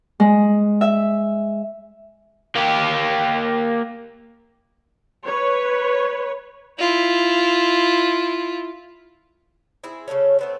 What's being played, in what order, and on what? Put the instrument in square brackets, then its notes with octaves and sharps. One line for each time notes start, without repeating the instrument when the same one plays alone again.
[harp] G#3
E5
[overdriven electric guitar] A#3 G4
[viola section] B4 C#5
[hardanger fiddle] E4 F4
[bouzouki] C4 E4 G#4
C#3 F#3 A3 C#4
A3 B3 C4